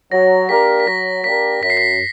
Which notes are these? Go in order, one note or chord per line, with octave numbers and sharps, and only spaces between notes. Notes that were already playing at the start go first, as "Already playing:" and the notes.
F#3 A#6
A#3 D4 G4 A#4 B6
B6
F#3 A#6
A#3 D4 G4 A#4 B6
F#2 B6
C7
B6